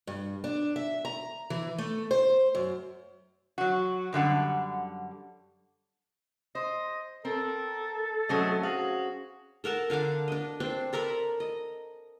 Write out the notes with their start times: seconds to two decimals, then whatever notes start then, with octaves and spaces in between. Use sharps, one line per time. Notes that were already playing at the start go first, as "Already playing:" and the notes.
0.07 G2
0.44 D4
0.76 E5
1.05 A#5
1.50 E3
1.78 A3
2.11 C5
2.55 F#2
3.58 F#3 F#4
4.13 F#2 D3 G3 F#5
6.55 C5 D#5
7.25 C4 A4 A#4
8.29 F#3 A3 C4 C#4 G#4 D#5
8.63 F#4 G#4 F5
9.64 A4 A#4 F#5 A5
9.90 D3 F5 F#5 D6
10.28 D4 D#5
10.60 C4 D4 C5
10.93 A4 A#4 A#5 B5
11.40 D#5